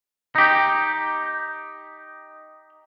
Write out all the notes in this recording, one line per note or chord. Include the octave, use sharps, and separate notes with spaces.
D#4 G4